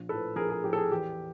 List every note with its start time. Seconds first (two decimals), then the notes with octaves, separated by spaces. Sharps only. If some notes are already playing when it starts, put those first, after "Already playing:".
Already playing: A#1
0.09 A2 F3 A4 B4
0.36 A#1 G#4 A#4
0.50 G#4
0.64 A2 F3 G4
0.73 A4
0.77 G#4
0.91 E2 G4